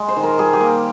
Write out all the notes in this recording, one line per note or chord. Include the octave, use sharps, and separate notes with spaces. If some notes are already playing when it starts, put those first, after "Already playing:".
Already playing: G#3
C5
D#3
A#4
G3 G#4
G4
A#3